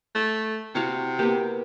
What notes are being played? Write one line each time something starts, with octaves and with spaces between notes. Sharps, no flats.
A3
C3 E4 F#4 F5
A#3 B3 G4